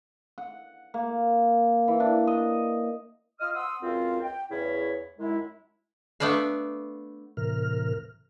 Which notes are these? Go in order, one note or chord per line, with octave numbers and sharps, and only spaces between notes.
F#5
A#3
E3
D4
D#5
F4 D#5 D#6 F6
F#5 C6 D#6 E6
C#2 F#2 C4 F4
G5
E2 C#3 E4 C#5
F#2 D#3 G#3 E4
A3 B3 D4 B4 F5
A2 C3 E3 A#4 F6